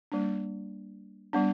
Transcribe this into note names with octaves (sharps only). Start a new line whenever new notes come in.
G3 A#3 D4
G3 B3 D4